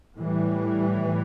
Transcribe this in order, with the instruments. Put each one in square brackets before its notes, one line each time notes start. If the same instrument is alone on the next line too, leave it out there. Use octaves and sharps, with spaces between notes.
[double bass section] A2 E3 G3